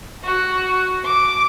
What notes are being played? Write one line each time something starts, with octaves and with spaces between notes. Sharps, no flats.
F#4
D6